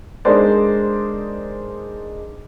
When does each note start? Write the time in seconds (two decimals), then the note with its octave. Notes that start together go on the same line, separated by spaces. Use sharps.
0.25 G#3 D4 D#4 A#4 C5 D5